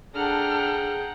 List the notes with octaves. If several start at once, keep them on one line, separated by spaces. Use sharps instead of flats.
D4 G#4 A4 F#5 G5 A#5 F6